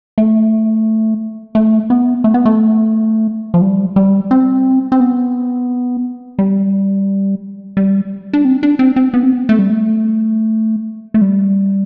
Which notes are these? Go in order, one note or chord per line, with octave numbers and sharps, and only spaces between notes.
A3
A3
B3
A3
B3
A3
F3
G3
G3
C4
C4
B3
G3
G3
D4
C4
D4
C4
C4
B3
C4
B3
A3
G3
A3
A3
G3